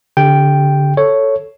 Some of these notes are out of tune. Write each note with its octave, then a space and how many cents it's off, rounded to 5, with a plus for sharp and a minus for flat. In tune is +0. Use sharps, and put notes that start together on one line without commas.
D3 -30 G4 +0 G5 +0
A4 +0 C#5 +0